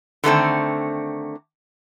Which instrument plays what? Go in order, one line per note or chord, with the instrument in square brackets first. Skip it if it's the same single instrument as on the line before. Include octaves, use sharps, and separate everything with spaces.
[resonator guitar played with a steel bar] D3 D#3 A3 C4